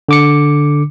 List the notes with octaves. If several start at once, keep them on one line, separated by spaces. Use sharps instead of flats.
D3 D6 C#7